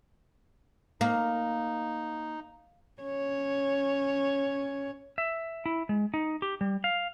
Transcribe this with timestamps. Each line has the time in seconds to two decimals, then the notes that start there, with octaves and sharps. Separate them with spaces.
1.01 A#3 D#4
3.02 C#4 C#5
5.18 E5
5.66 E4
5.89 G#3
6.14 D#4
6.42 G4
6.61 G3
6.84 F5